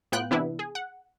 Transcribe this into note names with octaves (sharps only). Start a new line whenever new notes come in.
A2 B3 F4 G5 F#6
C3 E3 B3 D4 E4 B4
G#4
F#5